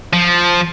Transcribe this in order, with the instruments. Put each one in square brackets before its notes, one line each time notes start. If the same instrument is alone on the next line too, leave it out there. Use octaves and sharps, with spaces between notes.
[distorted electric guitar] F3